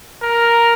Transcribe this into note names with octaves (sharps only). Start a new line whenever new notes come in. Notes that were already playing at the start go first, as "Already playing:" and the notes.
A#4